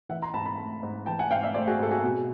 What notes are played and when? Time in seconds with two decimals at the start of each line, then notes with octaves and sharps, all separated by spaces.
0.09 E3 E5 F#5
0.22 A#5 C6
0.34 G#2 A5 B5
0.46 A5 B5
0.58 A3
0.83 G#2
1.06 E3 G5 A5
1.19 F#5 G#5
1.30 G#2 F5 G5
1.43 D5 E5
1.55 A3 C5 D5
1.67 F#4 G#4
1.79 G#2 A4
1.91 F#4 G#4
2.04 B2